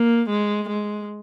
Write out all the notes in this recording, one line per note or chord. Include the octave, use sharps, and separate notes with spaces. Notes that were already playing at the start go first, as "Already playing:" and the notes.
Already playing: A#3
G#3
G#3